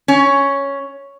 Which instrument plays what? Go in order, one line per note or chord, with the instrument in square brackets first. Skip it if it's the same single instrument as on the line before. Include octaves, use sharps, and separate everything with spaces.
[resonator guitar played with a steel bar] C#4